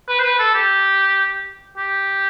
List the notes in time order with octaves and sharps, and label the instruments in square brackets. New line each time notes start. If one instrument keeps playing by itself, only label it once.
[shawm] B4
C5
B4
A4
G4
G4